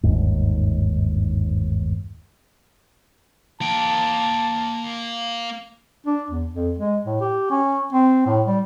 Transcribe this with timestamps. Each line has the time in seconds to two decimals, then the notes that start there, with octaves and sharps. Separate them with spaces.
0.03 G1 D#2 G#2
3.61 A#3 G5 A5
6.05 D4
6.30 E2
6.52 F2
6.78 G#3
7.05 A2
7.21 G4
7.51 C#4
7.93 C4
8.26 A2
8.46 G3